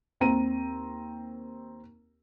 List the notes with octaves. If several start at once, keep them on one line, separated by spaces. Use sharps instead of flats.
D#2 C4 A#5 D#7